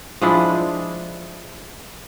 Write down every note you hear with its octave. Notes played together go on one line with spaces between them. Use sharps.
F3 G#3 D4 E4